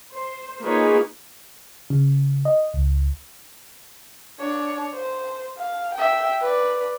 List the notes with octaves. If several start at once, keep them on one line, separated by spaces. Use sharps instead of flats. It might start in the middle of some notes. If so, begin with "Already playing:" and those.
C5
A#3 D#4 F4 G#4 B4 C#5
C#3
D#5
C#2
D4 C#5
C5
F5
E5 G5
B4 D5